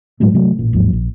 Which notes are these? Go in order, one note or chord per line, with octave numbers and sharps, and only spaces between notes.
A2 F#3 G#3 A3
C3 F#3 A3
A1 A#2
G#1 D#2 F3 F#3
A#1